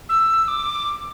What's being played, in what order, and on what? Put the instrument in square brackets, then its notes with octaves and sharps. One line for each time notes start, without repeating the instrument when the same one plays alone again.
[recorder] E6
D6